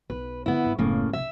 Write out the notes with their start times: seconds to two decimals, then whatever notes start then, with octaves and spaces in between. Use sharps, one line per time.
0.10 B1 B4
0.46 D3 B3 C4 E4
0.64 G#1 G3
0.78 F#1 A2 C#3 A#3 B3
1.13 B1 C3 E5